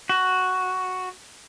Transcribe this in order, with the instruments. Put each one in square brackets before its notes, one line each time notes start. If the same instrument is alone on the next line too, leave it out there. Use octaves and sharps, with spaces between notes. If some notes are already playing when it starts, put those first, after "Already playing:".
[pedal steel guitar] F#4